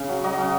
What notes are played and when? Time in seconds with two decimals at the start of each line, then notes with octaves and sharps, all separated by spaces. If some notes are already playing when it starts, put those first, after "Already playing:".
Already playing: C#3
0.09 F#3
0.24 F#3 D#5
0.38 C#3